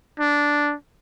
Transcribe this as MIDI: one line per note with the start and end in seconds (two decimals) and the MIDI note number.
0.20 0.74 62